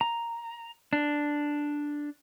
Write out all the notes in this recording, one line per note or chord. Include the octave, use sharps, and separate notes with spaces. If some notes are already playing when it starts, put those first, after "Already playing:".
A#5
D4